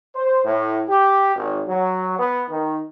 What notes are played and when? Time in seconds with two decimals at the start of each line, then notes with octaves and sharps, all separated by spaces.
0.15 C5
0.45 A2
0.88 G4
1.36 G#1
1.67 F#3
2.19 B3
2.50 D#3